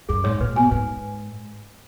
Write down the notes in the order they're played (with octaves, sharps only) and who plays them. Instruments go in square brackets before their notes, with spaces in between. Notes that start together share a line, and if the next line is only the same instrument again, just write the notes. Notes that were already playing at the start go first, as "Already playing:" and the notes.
[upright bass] F#2 [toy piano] G#4
[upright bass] G#2 [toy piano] C#5
[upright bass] A#2 [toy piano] B4
[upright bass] B2 [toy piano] G#5
[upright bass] G#2 [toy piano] B4